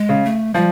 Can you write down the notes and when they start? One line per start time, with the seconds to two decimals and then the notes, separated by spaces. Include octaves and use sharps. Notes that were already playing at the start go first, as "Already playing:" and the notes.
Already playing: G#3
0.09 C#3
0.25 A3
0.54 F3 G3